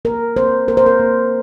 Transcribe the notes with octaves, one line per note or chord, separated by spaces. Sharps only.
A#3 A#4
A#3 C5
A#3 A#4
C5
A#4
A#3